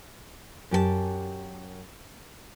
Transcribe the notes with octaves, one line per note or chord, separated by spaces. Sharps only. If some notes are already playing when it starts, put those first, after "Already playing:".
F#2 G4 A4 A5